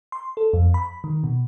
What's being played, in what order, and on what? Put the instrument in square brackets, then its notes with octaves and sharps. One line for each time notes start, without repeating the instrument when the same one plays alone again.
[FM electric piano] C6
A4
F2
B5
D#3
B2